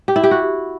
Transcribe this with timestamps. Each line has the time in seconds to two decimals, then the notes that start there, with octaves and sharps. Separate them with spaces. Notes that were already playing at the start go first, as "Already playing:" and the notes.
0.08 G4
0.16 E4
0.23 G4
0.31 F#4